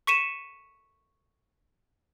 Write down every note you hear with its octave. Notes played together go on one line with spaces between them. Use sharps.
C#6 B6 C#7 D#7 E7